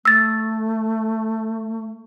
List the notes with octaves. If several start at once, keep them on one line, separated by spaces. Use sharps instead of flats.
A3 E6 A6